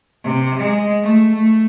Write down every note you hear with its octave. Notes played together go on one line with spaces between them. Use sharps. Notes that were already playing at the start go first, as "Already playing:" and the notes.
C3
G#3
A3
A3